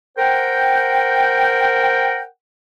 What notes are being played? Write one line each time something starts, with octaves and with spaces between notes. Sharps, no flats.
A#4 C5 F#5 G5